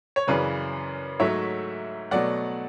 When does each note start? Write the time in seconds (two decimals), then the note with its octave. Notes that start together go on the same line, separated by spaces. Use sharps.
0.16 C#5
0.27 F#2 C#3 E3 B4 D5
1.20 G#2 F#3 A3 C#5 E5
2.11 B2 F#3 A3 D5 F#5